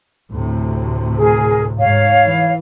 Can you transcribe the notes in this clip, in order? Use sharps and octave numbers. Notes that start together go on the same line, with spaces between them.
D2 A2 C3
G#4 A#4
G#2 C#5 F5
E3